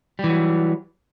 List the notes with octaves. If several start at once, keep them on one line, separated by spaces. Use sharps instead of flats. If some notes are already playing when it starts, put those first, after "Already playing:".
E3 F#3 G3